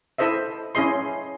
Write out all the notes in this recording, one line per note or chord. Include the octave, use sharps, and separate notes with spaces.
E4 A4 C5 D#5 E5
C#4 E4 G#4 D#5 C6